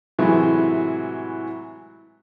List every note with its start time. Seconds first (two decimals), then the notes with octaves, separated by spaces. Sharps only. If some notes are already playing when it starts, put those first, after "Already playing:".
0.19 A2 C3 E3 F#3 G#3